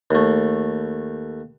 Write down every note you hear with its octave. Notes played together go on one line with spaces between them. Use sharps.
D#2 A3